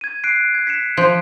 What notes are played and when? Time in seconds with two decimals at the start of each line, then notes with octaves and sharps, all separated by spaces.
0.01 G#6 D#7
0.24 F#6 C7 D7
0.55 G#6
0.67 B6 C#7 E7
0.97 F3 G6 D7